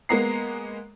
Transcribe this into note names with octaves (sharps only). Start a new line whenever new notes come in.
G#3 A#3 B3 A#5 C7